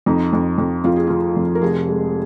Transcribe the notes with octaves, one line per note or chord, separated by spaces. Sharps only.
F2 D#4
F2
F2
F2 F4
G#4
F3 F4
F2
A#4
F1 G#4
G#3